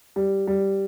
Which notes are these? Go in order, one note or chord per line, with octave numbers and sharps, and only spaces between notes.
G3
G3